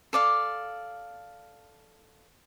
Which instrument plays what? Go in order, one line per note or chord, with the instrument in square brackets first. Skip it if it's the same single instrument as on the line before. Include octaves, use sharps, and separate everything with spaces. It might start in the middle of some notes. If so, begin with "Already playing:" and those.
[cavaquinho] A4 D5 F5